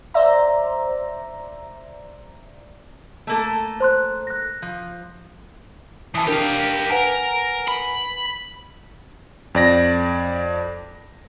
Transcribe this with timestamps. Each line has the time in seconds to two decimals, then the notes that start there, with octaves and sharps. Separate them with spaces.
0.14 C5 D5 E5 A#5
3.27 A3 A#3 A4
3.80 C5 C6 F#6
4.27 F#6 A#6
4.62 F3
6.15 E3 A5 D#6
6.28 D4 G4 A#4 F5
6.90 A#4 B4 F#5 G#5
7.68 B5
9.55 F2 D5 A#6